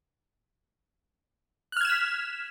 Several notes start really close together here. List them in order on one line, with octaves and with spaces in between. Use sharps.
F#6 F6 G#6 E7 B6